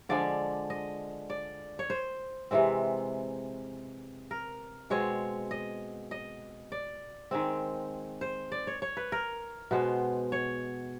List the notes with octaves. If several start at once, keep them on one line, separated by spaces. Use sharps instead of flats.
D3 F3 G#3 D5
D#5
D5
C#5
C5
C3 E3 G#3 C4
A#4
B2 G#3 C4 C#5
D#5
D#5
D5
D#3 G#3 C4
C5
D5
C#5
C#5
B4
A#4
B2 G#3 B3 C5
C#5